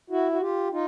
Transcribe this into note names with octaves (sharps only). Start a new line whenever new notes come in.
E4 F#4
F#4
F4 G4
D#4 F4